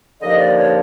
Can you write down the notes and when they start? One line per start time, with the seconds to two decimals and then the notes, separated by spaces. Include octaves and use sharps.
0.21 D#2 D3 F3 A#3 D#5
0.38 D5
0.55 C#5